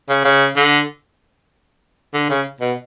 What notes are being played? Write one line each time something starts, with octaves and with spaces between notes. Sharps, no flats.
C#3
C#3
D3
D3
C#3
B2